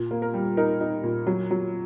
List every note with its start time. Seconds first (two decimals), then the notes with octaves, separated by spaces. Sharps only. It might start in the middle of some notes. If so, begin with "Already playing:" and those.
Already playing: A#2
0.11 A#3
0.22 A#4
0.34 G3
0.57 D#4 A#4
0.81 D#4
1.03 A#2
1.27 F#3
1.51 F#3